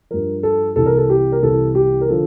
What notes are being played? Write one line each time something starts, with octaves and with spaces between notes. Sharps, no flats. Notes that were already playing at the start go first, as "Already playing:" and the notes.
G2 F3 A#4
A4
C2 C3 E3 A4
A#4
A4
G4
A#4
C2 C3 E3 A4
G4
A#4
D3 F3 A4